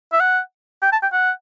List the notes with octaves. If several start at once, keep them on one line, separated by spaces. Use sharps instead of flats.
E5
F#5
G5
A5
G5
F#5